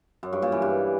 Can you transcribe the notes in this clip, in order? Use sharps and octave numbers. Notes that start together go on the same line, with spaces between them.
F#2
G2
A#2
E3
G2